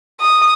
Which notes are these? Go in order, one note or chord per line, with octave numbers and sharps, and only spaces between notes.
D#6